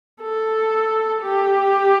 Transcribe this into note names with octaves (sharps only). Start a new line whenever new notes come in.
A4
G4